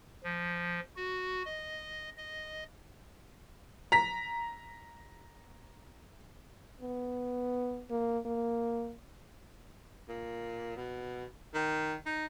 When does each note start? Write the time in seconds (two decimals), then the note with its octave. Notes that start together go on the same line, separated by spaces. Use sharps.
0.24 F3
0.96 F#4
1.45 D#5
2.17 D#5
3.92 A#5 B6
6.81 B3
7.90 A#3
8.26 A#3
10.09 A#2
10.77 B2
11.54 D#3
12.06 D#4